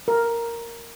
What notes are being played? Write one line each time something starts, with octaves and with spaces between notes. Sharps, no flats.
A#4